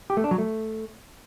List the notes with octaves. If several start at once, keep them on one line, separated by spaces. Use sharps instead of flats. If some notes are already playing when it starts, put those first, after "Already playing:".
G4
A3
D4
F#3
A3